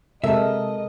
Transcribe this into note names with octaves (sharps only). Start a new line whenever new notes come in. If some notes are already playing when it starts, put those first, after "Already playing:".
C3 G#3 A4 A#4 D#5 E5